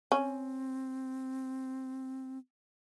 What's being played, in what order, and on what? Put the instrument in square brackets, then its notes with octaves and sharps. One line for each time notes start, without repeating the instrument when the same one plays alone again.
[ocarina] C4 [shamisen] C#4